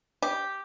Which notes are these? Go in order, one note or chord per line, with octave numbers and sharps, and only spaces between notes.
G4